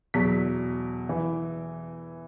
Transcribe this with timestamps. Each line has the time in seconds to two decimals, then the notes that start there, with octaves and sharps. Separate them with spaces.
0.14 E2 B2 F#3 B6
1.09 E3